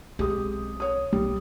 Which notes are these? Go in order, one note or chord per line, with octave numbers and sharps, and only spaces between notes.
B1 G#3 C4 G4 D#6
C#5 D#6
B1 G3